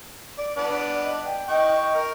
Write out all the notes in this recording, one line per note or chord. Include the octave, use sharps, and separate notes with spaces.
D5
B3 D4 D5
D#5
G5
D#5 G5 C#6
A#4